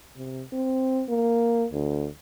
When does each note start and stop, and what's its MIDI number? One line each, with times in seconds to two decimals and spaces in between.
0.17 0.43 48
0.53 1.03 60
1.09 1.66 58
1.72 2.08 38